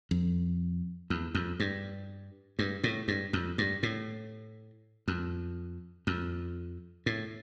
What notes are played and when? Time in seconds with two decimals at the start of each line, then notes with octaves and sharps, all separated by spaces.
0.11 F2
1.10 E2
1.35 F2
1.60 G2
2.59 G2
2.84 A2
3.08 G2
3.33 F2
3.58 G2
3.83 A2
5.08 F2
6.07 F2
7.06 A2